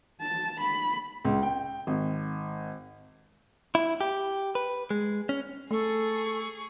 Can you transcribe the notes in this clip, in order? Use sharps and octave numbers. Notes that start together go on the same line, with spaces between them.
A5
B5
C#2
G5
G#1
E4
G4
B4
G#3
C#4
A3 G#4 A4 C#6